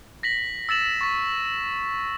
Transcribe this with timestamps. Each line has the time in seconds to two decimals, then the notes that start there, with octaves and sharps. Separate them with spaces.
0.23 A#6 B6 F#7
0.69 E6 A6 E7 F#7
1.01 C#6 A6 B6